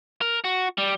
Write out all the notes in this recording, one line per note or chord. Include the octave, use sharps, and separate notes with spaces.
A#4
F#4
G3